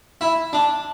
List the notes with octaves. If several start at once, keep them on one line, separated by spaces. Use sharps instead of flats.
E4
D4